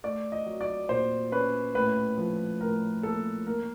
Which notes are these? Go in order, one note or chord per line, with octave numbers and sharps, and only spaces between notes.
A3 D5
D#5
F#3
D5
A#2 C5
C#4 B4
A2 B4
F3
A2 A#4
A#3 A4
A#3 A#4